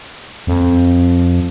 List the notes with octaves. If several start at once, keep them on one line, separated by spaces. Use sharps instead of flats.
F2